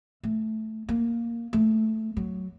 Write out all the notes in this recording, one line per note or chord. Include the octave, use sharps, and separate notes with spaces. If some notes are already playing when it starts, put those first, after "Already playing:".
A3
A#3
A3
F#3